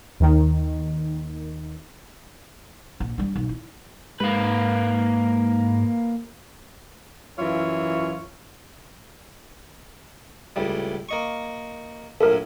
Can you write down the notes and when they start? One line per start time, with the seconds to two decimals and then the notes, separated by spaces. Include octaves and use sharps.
0.20 D#2 D#3
3.00 A#1
3.18 G3 D4
3.36 B1
3.49 E4
4.20 G#2 A#3 B4
7.39 F#2 E3 F4 C#5 E5 F5
10.56 C#2 A2 G3
11.09 A#3 D#5 C#6
12.21 A#1 F#2 A2 A4 A#4